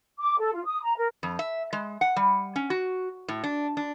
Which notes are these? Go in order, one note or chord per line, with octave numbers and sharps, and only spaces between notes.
D6
A4
F4
D#6
A#5
A#4
F2
E5
G#3
F#5
G3
C#4
F#4
A2
D4
D4